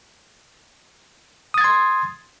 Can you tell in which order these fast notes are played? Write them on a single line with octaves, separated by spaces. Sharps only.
D#6 A6 G#6 C6